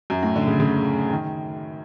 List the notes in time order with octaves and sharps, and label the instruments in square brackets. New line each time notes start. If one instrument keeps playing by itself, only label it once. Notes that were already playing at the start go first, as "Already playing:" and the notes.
[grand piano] F#2
A2
D3
C#3
C#3
D#3